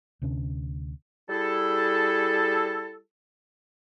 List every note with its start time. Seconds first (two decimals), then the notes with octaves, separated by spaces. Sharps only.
0.22 D2 C3 C#4 D4
1.29 G3 E4 G#4 A4